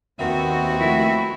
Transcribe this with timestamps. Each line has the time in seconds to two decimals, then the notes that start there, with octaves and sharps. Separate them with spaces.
0.19 D#2 B3 C4 F#4 A#4 E5
0.80 F3 A3 E4